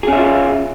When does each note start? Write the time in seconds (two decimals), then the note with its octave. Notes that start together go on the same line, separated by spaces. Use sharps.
0.03 G#4
0.08 C#4
0.13 E5
0.17 F4